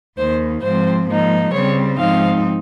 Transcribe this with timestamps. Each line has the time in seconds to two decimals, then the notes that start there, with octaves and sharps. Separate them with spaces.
0.17 D#2 D#3 A#3 C5
0.62 G#2 F3 C4 C5
1.08 G#2 F3 A#3 D#4
1.52 C#3 G3 C4 C#5
1.98 G#2 F3 C4 D#4 F5